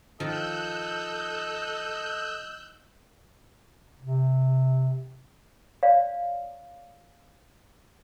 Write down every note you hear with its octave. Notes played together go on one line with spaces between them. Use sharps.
D#3 F3 A4 D#5 A#5 E6 F#6 G6
C3
C#5 D5 F5